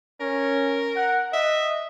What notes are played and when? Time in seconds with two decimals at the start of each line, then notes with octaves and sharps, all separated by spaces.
0.21 C#4 A#4
0.96 F#5
1.33 D#5 E5